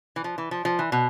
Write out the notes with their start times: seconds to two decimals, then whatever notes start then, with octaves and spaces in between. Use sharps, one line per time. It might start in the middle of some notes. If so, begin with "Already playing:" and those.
0.16 E3
0.24 F3
0.38 E3
0.51 F3
0.65 F3
0.79 E3
0.92 B2